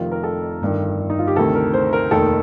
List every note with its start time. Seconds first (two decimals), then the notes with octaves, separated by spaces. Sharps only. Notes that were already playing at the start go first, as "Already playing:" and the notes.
Already playing: F1 F2 C3 D#3 F4
0.12 A#4
0.23 A4
0.61 G1 G2 D#3
1.10 D#4
1.19 F4
1.27 G4
1.36 D2 C3 D#3 A4
1.55 A#4
1.74 C5
1.93 A#4
2.11 F1 D#2 D#3 A4